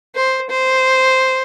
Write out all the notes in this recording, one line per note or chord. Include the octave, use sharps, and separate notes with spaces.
C5
C5